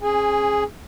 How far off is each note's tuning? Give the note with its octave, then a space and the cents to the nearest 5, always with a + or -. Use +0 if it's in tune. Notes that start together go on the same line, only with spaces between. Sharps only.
C#4 -35 G#4 +0 G#5 -20